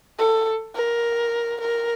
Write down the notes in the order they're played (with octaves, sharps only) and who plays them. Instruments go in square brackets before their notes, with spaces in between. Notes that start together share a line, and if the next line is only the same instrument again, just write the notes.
[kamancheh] A4
A#4
A#4